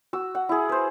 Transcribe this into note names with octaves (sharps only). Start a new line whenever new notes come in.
F#4 E6
F#5
E4 G#4
B4 C5